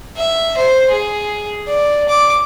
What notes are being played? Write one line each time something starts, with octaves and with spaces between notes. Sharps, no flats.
E5
C5
G#4
D5
D6